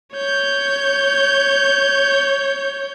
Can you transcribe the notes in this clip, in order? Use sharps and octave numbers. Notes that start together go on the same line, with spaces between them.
C#5 G6